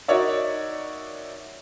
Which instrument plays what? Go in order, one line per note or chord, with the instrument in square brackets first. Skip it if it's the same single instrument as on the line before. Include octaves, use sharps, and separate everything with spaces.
[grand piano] D#4 F#4 A#4 C#5 D5 E5